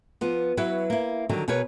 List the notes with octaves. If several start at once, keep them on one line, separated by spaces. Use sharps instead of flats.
F3 B3
F#3 E4 F#4 B4
A#3 E4
D3 D#3 F#3 G3
B2 G#4 A#4 B4 C#5